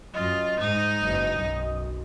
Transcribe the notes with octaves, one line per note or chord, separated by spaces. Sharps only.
F#2 F4 D#5
G#2 D#4
F#1 E2
B1 F#2